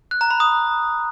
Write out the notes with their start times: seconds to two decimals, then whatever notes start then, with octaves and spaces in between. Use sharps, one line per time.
0.11 F#6
0.21 A#5
0.31 B5
0.40 D#6